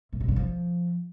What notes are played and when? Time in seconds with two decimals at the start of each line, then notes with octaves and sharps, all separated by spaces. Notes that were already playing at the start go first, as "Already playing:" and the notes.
0.13 A2
0.20 C3
0.28 C#3
0.36 F3